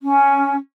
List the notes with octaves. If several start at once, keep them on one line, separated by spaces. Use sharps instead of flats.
C#4